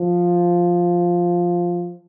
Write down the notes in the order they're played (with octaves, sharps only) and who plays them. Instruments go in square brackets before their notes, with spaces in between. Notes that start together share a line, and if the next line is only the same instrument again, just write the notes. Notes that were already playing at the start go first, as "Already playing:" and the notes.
Already playing: [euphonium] F3